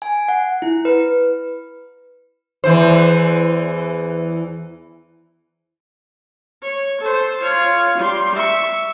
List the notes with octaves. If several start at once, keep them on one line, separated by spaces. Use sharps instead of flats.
G#5
F#5
E4
B4
E2 E3 C5
C#5
A4 C5
F4 C#5
G3 C6
E5 C#6